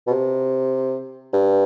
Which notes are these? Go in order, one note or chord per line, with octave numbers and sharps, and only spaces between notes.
B2
C3
G2